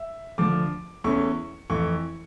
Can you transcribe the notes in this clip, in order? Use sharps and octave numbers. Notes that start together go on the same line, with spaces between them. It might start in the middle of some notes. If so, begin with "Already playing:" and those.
Already playing: E5
D2 D3 F3 A3 D6
E2 E3 A3 C#4 C#6
F2 E3 A3 C#6